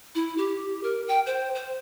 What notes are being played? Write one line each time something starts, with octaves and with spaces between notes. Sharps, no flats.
E4
G4
A#4
G5
C5
C5